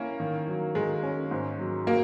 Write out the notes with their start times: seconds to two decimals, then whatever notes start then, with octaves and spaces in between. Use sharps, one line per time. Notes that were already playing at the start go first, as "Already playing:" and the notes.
Already playing: A#3 C#4 E4
0.20 D#3
0.47 F#3
0.75 D#3 G#3
1.03 C#4
1.31 G#2
1.59 F#3
1.87 A#3 F#4